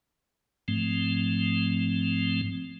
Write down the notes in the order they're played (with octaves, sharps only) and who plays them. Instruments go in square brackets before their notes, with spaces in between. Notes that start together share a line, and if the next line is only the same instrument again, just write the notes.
[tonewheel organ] G#2 F3 A3 C4